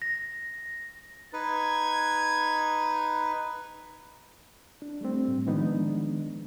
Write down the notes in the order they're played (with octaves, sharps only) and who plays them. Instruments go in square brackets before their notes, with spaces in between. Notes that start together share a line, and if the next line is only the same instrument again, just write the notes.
[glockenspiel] A#6
[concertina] D#4 B4 [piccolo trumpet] G#6
[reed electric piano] D4
G3 A3 C4
A2
D#3 F3 G#3 B3 D4 D#4